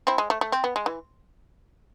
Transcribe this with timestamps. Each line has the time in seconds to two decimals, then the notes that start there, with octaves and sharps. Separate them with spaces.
0.07 C4 E4
0.18 G#3
0.30 A3
0.41 A3
0.52 C4
0.64 B3
0.76 G#3
0.86 E3